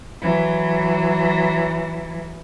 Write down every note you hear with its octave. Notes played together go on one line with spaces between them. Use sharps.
E3 F#3